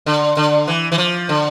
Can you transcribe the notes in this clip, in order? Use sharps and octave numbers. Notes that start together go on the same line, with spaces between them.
D3
D3
E3
E3
F3
D3